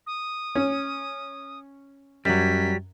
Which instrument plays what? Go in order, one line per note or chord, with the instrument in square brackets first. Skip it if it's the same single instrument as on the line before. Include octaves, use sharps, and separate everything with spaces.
[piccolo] D#6
[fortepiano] C#4
[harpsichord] F#2 [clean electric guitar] F#3 G3 [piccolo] B6